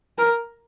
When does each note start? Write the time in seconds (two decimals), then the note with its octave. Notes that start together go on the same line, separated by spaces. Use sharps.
0.18 A#4